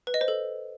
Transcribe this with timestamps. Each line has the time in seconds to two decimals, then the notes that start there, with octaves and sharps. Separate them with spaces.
0.07 B4
0.14 D#5
0.21 C5
0.28 A4